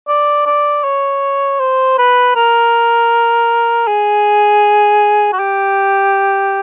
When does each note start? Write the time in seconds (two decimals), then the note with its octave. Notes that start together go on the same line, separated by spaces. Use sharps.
0.08 D5
0.46 D5
0.84 C#5
1.60 C5
1.98 B4
2.35 A#4
3.87 G#4
5.33 F#4
5.39 G4